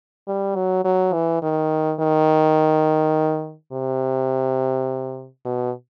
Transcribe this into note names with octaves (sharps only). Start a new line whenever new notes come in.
G3
F#3
F#3
E3
D#3
D#3
C3
B2